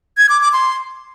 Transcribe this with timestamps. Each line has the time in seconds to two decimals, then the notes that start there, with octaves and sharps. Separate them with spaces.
0.18 G#6
0.29 D6
0.41 D6
0.53 C6